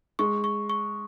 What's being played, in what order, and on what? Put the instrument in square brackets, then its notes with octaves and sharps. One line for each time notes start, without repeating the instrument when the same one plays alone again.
[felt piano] G#3 [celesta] C#6
[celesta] C#6
C#6